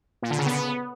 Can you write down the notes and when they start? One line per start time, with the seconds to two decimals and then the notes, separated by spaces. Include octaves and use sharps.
0.22 A#2
0.30 D3
0.38 C#3
0.46 B3